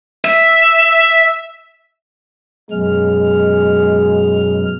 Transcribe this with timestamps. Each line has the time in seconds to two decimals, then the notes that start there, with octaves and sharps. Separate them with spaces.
0.25 E5
2.71 F#2 B2 G#3 F6